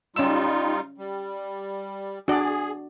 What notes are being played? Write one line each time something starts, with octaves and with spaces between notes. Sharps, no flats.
G3 C#4 D#4 F4 E6
G3
D4 F#4 G#4 D5